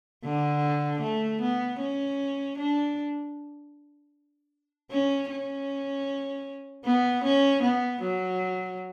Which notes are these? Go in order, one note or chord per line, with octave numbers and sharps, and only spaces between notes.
D3
A3
B3
C#4
D4
C#4
C#4
B3
C#4
B3
F#3